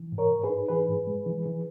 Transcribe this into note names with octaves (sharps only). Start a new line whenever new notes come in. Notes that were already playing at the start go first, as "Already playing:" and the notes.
Already playing: E3
G#2
A#4 C#5
G#2
G#4 B4
D#4
E3 G#4 B4
G#2
G#3
E3
E3